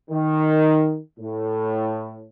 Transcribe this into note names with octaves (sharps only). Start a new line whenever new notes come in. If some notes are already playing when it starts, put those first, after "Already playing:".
D#3
A2